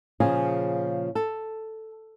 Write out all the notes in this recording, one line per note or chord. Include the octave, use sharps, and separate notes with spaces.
A#2 C#3 F3 F4 G#4
A4